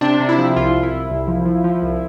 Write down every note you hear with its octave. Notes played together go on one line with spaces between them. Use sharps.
C3 D4
C3
E4
F3
C2 F4
C2
E4
C2
C2
F3
F3
F3
C2